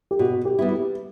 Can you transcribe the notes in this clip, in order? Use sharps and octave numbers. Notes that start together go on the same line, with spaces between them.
G4
B2 F#4
G4
G3 B3 E4
G4